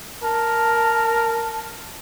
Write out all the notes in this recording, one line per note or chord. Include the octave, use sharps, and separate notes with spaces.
A#4 A5